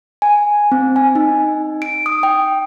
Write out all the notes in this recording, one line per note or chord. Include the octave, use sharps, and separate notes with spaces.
G#5
C4
G#5
D#4
D7
D#6
G5